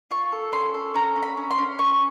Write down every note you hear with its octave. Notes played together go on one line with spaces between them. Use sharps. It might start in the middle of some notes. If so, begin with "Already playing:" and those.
F4 C#6
A4
C#4 C6
A4
C#4 A#5
C#4
B5
C#4
C6
C#4
C#4 C#6